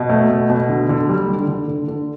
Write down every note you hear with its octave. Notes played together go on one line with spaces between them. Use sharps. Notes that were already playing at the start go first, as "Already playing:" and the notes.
Already playing: B2
A3
B2
B2
D3
D3
G3
D3
D3
D3
D3